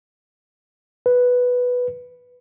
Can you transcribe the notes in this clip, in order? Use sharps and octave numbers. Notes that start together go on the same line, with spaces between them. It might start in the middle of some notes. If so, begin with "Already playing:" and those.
B4